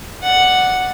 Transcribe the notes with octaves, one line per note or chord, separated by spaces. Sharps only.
D5 F#5